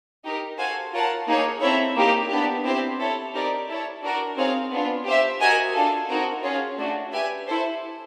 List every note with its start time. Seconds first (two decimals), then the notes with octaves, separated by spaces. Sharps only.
0.24 D#4 G4 A#4
0.59 F#4 A4 C5 F5 G#5
0.93 F4 A#4 C#5 F#5 A5
1.28 A#3 D#4 G#4 C#5
1.62 C4 E4 A4 C#5 E5
1.96 A#3 D#4 G4
2.31 B3 D4 G4
2.65 C4 E4 G4 C5 E5
2.99 E4 A4 C#5
3.34 C4 D#4 G4 A#4 D5
3.68 E4 A4 C#5
4.03 D4 F#4 A#4 D5
4.37 C4 D#4 G#4 C#5 F5
4.72 B3 D4 F4
5.06 G4 C5 E5
5.40 F#4 A#4 D#5 G#5
5.75 D4 F4 A4
6.09 C4 D#4 F#4 A#4
6.44 C#4 F4 G#4 C#5
6.78 A3 D4 F#4
7.12 G4 B4 E5 G#5
7.47 E4 A4 C5